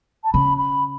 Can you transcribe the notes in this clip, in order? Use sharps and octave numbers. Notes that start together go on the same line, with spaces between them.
A5
C#3 B5
B5